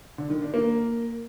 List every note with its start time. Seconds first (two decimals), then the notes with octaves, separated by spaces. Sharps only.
0.18 D3
0.30 D#3
0.42 D4
0.54 A#3